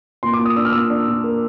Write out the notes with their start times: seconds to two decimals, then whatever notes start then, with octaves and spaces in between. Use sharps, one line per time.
0.23 A#2 C6
0.34 D6
0.39 A#2
0.45 D#6
0.57 D4 E6
0.65 F6
0.72 A#2 E6
0.90 D4
1.08 A#2
1.24 A#3